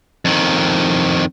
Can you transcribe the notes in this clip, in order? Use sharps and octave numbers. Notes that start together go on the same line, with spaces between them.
F2 D#3